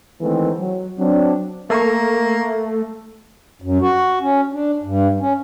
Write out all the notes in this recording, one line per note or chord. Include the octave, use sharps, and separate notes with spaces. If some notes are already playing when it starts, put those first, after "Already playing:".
D#3 E3 G#3 A3 B3 C4
F#3
F#3 C4 D4
A3 A#3 A#4 A#5 C#6
F#2
F#4
C#4
D4
G2
C#4